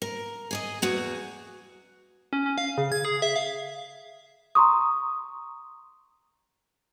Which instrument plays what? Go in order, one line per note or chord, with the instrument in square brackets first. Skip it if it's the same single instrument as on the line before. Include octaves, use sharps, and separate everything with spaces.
[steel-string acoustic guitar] A#4
G#4 D5 D#5
E2 F#4 G#4
[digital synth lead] C#4
C#4
F5
C#3
G#6
G#4
E5
F5
[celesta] A#5 C6 C#6 D#6